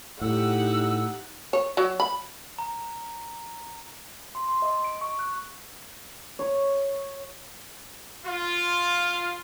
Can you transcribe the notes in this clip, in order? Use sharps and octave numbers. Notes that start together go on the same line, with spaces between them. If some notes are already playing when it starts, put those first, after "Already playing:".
A2 D#4 G4 F#5 E6
C#5
F#3
B5
A#5
C6
C6
D#5
D7
C#6
F#6
C#5
F4